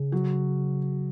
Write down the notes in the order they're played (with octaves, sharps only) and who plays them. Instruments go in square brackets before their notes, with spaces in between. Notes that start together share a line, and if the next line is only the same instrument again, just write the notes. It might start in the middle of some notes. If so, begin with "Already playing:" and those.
Already playing: [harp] C#3
[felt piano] F#3